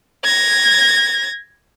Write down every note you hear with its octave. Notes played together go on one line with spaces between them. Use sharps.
G#6 A#6